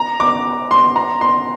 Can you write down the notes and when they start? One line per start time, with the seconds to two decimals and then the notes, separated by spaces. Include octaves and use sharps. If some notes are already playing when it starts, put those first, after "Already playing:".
Already playing: A#5
0.20 D6
0.71 C6
0.96 A#5
1.21 C6